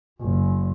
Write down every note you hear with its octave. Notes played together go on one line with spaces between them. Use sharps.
F#1